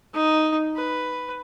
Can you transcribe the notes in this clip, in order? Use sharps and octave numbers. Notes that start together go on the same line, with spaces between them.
D#4
B4